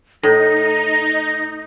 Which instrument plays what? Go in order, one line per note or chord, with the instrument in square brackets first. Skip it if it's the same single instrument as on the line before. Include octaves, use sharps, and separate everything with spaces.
[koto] A2 [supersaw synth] D#4 [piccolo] A#6